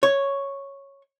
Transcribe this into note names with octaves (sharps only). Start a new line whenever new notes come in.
C#5